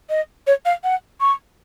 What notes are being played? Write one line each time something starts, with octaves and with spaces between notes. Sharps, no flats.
D#5
C#5
F5
F#5
C#6